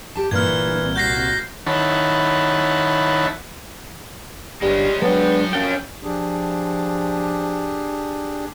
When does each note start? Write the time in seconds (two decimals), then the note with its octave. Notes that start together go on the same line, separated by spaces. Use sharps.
0.15 G4 A5
0.31 G2 A#2 E3 F6 G#6
0.49 G1
0.82 C2
0.96 F#4 G6 A#6 C7
1.67 D#3 E4 C#5 F#5 A5 B5
4.62 G1 G3 G#3 C#4
5.02 F#3 G#3 B3 D4 A4 G5
5.53 F#2 F3 C#4 A4 F5 G5
6.03 F3 D4 G4 G#4